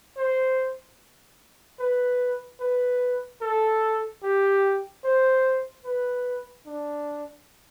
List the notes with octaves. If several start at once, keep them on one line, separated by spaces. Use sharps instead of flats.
C5
B4
B4
A4
G4
C5
B4
D4